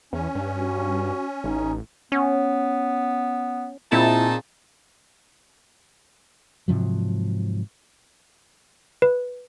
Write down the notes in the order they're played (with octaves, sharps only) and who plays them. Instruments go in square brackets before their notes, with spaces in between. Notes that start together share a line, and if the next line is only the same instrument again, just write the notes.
[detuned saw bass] E2 [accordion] C#4
[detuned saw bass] G2
[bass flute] F#4
[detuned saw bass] A1 [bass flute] D#4
[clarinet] B3 [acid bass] C#4
[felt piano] A#2 C4 [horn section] D#4 G#4 A5 [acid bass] E4
[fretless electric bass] G#2 C3 F3 F#3
[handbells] B4